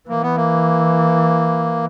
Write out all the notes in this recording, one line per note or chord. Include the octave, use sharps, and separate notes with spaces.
E3 A#3
B3
A#3